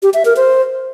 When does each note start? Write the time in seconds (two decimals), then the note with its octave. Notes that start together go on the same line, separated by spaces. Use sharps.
0.03 G4
0.14 E5
0.25 A#4
0.37 C5